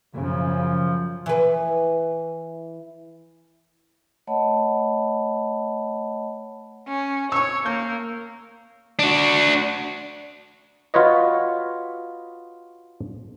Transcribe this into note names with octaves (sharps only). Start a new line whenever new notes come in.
F#2 C#3 F3
E3 B4
A3 C#5 D#5 F#5 A5 B5
C#4
C#5 C#6 E6
A#3 G6
D4 F#4
F4 F#4 B4 C#5 D#5